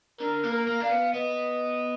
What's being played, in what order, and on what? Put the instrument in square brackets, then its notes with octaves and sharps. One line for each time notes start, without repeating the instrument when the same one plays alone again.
[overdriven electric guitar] D3 [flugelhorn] A#4
[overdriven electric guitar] A#3
[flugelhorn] A#4
[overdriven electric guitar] A#3
[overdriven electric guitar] D4 [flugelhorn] F5
[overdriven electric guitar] B3
[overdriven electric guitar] B3 [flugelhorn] D#5